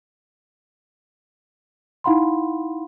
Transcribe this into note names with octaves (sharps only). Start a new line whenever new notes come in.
D#4 E4 F5 F#5 B5 C6